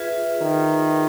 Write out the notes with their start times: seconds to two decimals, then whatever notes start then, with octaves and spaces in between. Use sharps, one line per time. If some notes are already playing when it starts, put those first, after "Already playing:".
Already playing: F4 G#4 B4 E5
0.41 D#3